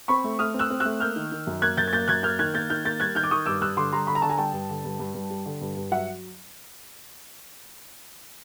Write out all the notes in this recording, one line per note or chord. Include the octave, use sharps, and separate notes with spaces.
C4 B5 C#6
A3
A3 D#6 F6
C4
E6 F#6
C4
A3 E6 F#6
A#3 F6 G6
D#3
D#3
F#2
A#3 F#6 G#6
F#2 G6 A6
G#6
A#3 G6 A6
F#2 F#6 G#6
A#3 F6 G6
D#3 F#6 G#6
A#3 G6 A6
D#3 F6 G6
A#3 G6 A6
G3 F#6 G#6
D#3 F6 G6
D6
D#3 C#6 D#6
G2 D6 E6
G2 E6 F#6
D3 C6 D6
G3 A#5 C6
D3 B5
A#5
D3 A5
G#5 A#5
G3 G5 A5
G2
D3
G2
G2
G2
G3
D3
G2
G2
F#3 E5 F#5